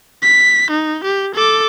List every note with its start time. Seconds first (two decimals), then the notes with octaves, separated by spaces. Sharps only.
0.22 B6
0.70 D#4
1.04 G4
1.35 A4 D6